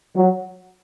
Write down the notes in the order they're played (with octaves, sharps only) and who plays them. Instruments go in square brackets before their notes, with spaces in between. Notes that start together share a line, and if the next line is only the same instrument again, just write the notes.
[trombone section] F#3